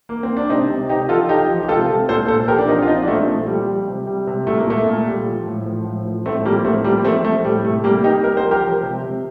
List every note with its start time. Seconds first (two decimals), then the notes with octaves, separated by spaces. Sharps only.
0.09 A#3
0.23 C4
0.37 D4
0.49 C3 C4 D#4
0.70 C3
0.89 C3 D#4 G4
1.09 F3 F4 A4
1.29 F3 D#4 G4
1.49 F3
1.63 G4
1.69 C3 F4 A4
1.89 C3
2.09 A#2 A4 C5
2.28 A#2 A4 C5
2.48 F3 G4 A#4
2.58 D4
2.68 F3 C4 D#4
2.82 F4
2.88 F3 C4 D#4
3.03 D4
3.08 A#2 A3 C4
3.27 F3 A3
3.47 F3 G3
3.67 G3
3.88 C3
4.07 G3
4.27 C3
4.47 A#2 A3
4.58 A#3
4.67 A#2 A3
4.87 A#2
5.07 G3
5.26 F3
5.46 A2
5.66 F3
5.85 A2
6.06 F3
6.26 A2 A3 C4
6.45 F3 G3 A#3
6.65 A2 A3 C4
6.84 F3 G3 A#3
7.04 F3 A3 C4
7.24 F3 A3
7.44 A2 G3
7.64 C3 A3
7.84 C3 G3 A#3
8.03 G3 D#4 G4
8.24 G3 A#4
8.37 C5
8.43 F3
8.51 G4 A#4
8.63 F3
8.83 C3
9.03 C3